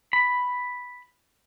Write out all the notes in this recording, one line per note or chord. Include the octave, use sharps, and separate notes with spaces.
B5